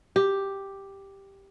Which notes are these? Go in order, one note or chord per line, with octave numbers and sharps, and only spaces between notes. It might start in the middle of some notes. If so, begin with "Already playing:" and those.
G4